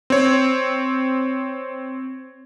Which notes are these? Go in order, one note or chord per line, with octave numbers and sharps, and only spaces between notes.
C4 C#5